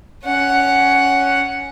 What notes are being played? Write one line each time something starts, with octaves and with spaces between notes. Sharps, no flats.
C#4 F#5